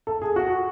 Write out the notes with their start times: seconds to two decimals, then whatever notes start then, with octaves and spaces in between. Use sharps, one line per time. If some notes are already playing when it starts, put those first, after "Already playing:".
0.07 A4
0.22 G#4
0.36 F#4